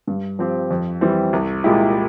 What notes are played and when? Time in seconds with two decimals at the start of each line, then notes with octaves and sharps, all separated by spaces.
0.07 G2
0.39 F3 C4 G4
0.70 F2
1.01 E3 G3 C4
1.33 C2
1.64 A#2 G#3 E4 G4